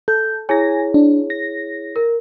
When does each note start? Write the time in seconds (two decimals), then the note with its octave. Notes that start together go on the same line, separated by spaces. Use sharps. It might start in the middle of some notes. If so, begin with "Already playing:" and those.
0.08 A4 G6
0.49 E4 G#4 C#5 G#5 A#6
0.94 D4
1.30 A#6
1.96 A#4